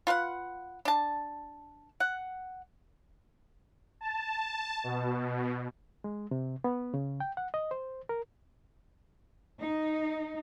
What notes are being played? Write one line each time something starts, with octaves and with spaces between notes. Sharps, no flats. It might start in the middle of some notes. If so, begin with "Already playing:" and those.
F4 B4 F5 F#5
D4 A5
F#5
A5
B2
G#3
C3
B3
C#3
G5
F#5
D#5
C5
A#4
D#4